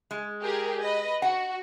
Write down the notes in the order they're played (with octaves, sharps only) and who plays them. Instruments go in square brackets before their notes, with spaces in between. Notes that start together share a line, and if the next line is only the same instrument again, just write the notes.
[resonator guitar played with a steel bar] G#3
[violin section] G4 G#4 A#4
B4 D#5
[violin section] F#4 [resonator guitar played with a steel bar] F#5